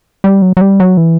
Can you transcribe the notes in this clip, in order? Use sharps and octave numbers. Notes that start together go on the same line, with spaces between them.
G3
F#3
F#3
G3
F#3
E3